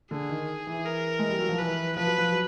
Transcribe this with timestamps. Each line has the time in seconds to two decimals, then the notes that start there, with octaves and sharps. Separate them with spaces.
0.11 D3 G#4
0.30 D#3
0.67 E3
0.85 A#4
1.19 G#3
1.30 G3
1.39 F#3
1.49 F3
1.58 E3 B4
1.96 F3 B4
2.07 F#3
2.18 F3
2.32 F#3